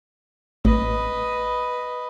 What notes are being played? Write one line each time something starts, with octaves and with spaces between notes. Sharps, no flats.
A1 B4 D#5